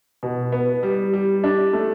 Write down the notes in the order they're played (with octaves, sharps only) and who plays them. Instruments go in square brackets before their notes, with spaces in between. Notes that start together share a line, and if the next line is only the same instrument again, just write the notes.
[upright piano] B2
B3
G3
G3
D4
A3